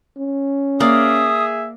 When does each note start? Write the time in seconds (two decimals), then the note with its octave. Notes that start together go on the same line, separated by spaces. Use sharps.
0.17 C#4
0.80 A#3 G#4 D5 E5 F5 D#6